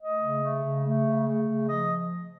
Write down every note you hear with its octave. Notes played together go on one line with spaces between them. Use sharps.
A3 D#5
C#3
A3
C#3
A3
C#3
A3
C#3
F3 D#5